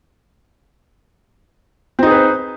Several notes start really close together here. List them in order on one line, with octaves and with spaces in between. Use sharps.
C4 D#4 G#4 B4 C5